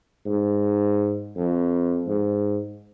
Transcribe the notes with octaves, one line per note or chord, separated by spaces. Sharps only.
G#2
F2
G#2